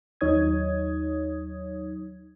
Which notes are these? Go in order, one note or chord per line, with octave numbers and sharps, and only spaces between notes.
D#2 F#3 D#4 C#5 D#6 G#6